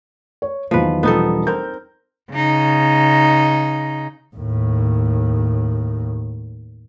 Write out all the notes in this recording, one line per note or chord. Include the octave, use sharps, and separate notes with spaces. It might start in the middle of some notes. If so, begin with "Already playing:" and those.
C#5
E2 D#3 F3 F#3 B4
E1 F3 G3 B3 D#4 A4
C4 A#4 G6
C#3 D#4
D#2 A2